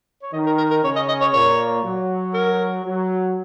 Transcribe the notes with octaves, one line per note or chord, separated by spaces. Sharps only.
C#5
D#3 D#5
A#4
A#4
A#4
C#3 C#4 C#5
D#5
D#5
C#5
A#2 A#3 C#5
F#3
A#4
F#3